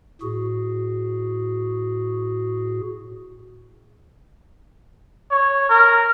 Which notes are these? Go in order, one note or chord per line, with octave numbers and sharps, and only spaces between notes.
A2 F#4 G#4
C#5
A#4